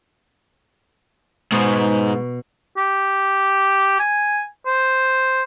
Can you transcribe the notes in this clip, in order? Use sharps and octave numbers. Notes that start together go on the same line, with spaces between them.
G#2 B2
G4
G#5
C5